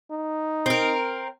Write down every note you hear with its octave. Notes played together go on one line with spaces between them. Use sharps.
D#4
C4 A#4